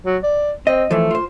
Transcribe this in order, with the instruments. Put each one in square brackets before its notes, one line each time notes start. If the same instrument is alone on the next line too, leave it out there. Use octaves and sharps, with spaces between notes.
[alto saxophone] F#3
D5
[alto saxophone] C4 [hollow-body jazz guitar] D#5
[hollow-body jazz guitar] E3 F3 [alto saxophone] A3
[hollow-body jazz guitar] F4 C5